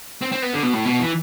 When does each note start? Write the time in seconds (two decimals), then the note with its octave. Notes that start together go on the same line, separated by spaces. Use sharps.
0.22 C4
0.32 C4
0.43 B3
0.54 D3
0.63 B2
0.74 A2
0.85 B2
1.00 E3